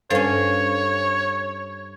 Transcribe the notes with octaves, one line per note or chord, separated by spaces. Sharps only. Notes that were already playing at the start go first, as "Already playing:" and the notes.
G2 C#4 A4 C5 C#5 F5